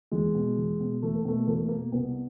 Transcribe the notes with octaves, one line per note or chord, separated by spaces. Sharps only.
E2 G#3
B2
E2
B2
E2 A3
A#3
B2 A3
E2 A#3
A3
B2 A#3
C2 B3